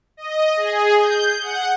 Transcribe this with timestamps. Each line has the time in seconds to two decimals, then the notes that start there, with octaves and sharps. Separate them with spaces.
0.17 D#5
0.56 G#4
0.98 G6
1.42 F#5